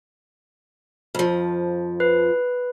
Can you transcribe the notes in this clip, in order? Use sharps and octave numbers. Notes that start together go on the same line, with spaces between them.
F2 F3
B4